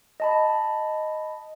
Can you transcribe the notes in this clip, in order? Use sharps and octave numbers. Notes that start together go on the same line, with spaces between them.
D#5 A5 B5